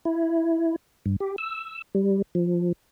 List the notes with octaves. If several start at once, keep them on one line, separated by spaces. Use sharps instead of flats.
E4
G2
G4
E6
G3
F3